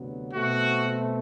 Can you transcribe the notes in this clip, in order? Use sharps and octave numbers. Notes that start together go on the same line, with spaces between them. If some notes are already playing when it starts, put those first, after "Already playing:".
Already playing: D2 C3 F#3 B3
B2 A3 C4 F#4